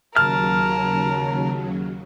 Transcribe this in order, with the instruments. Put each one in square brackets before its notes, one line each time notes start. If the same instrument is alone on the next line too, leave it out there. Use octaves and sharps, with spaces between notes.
[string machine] D#2 C#3 F#3 [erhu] A#4 [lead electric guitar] A5 [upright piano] F6